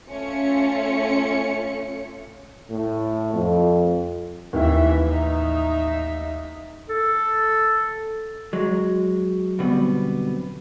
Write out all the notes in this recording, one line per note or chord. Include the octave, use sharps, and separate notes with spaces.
A3 C#4 F4 C#7
A2
F2
D#2 E3 E4 E5
A1 D#4 E5
A4
F#3 G#3
B2 D3 F#3 G3 B3 C4